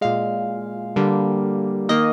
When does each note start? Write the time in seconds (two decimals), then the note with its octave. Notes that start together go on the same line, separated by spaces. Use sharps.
0.01 A#2 G#3 F5
0.96 D3 G3 A#3
1.89 D#3 A#3 D#5